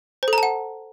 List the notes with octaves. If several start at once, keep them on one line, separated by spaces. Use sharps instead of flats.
C5
A4
A#5
A5
F#5